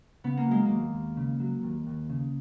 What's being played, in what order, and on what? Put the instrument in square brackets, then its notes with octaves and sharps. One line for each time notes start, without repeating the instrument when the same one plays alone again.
[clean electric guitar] C#3 [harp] B3
[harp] A#3
[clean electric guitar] F#3 [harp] G#3
[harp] A#3
[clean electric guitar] D#2
D#2
C#3
F#3
D#2
D#2
C#3